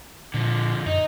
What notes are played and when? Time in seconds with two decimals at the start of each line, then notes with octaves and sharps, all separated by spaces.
0.34 A#2 D3 F3
0.86 F#2 D#4